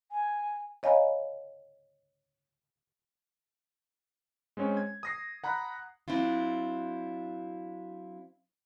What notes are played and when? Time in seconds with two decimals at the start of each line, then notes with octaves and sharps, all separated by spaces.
0.11 G#5
0.83 C#5 D#5 F5 G#5 A#5 B5
4.57 G#3 C4 C#4 C#5
4.77 G#6
5.03 D#6 A#6 C7
5.44 F#5 A#5 B5 F#6
6.08 F#3 C4 D4 E4 F4